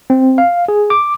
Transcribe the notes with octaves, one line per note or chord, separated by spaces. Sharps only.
C4
F5
G#4
D6